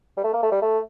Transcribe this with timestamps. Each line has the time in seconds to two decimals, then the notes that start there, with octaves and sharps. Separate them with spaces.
0.17 G3
0.24 A3
0.34 A#3
0.43 A3
0.52 G3
0.62 A3